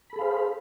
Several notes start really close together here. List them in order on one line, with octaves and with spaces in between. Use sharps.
B5 A4 G#4 F5 C5